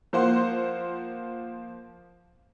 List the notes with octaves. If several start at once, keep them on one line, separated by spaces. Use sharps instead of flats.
F3 A#3 C5 F#5 C6